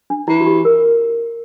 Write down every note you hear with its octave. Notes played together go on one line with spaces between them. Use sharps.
D4
E3 E4
F#4
G4
A#4